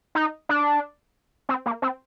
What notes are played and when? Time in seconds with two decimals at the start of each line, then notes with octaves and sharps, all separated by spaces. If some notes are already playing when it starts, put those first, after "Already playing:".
0.15 D#4
0.49 D4
1.49 C4
1.66 A#3
1.82 C4